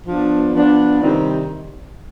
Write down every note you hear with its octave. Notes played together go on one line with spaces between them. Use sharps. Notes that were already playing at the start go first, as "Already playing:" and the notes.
F3 B3 D4
F3 B3 D4
C3 D#3 G3 C4 D#4